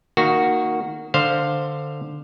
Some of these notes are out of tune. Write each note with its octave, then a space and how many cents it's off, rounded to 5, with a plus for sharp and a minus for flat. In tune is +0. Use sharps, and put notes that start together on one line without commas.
D#3 +0 A#3 -15 F#4 +0
D3 +15 C5 +0 F5 +0